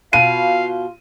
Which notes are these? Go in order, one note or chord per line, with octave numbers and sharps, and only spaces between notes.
B2 F4 F5 D#7